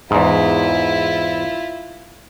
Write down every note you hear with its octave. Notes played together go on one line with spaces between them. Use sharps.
E2 G#2 E4 F4